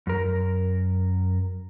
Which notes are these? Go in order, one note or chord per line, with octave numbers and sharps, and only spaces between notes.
F#2 A#4